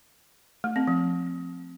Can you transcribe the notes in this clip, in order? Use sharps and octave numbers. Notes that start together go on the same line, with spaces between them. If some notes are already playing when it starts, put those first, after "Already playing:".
A3
C4
F3